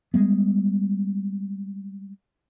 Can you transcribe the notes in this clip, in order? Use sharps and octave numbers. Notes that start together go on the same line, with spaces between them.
G3 G#3 B3